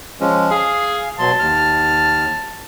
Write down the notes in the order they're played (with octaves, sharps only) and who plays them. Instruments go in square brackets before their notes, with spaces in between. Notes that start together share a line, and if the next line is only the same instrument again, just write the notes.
[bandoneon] F3 G#3 C#4
[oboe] G#4 [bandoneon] F5
[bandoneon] B2 F#3 C6 [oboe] A5
[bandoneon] D#2 F6